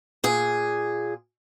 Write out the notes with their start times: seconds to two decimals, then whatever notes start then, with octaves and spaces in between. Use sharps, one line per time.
0.24 A#2 G#4